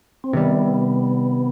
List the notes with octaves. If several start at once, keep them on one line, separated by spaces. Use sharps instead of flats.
C4
C3 D#3 G3 B3